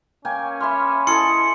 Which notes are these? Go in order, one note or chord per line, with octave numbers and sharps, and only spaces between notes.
A#3 C#4 G5 G#5
E5 B5 C6 D6 F6
E4 G#4 A4 D#5 C6 C#7